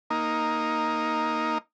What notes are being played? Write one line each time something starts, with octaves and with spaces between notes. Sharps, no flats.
A#3 D#4